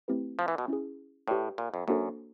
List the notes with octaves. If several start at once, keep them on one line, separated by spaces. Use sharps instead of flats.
A3 C4 E4 G4 B4
F3
E3
B2
C#4 E4 G#4
A2 G4 B4 D5 G5
A#2
F2
F#2 A#3 D4 F#4 A4 C5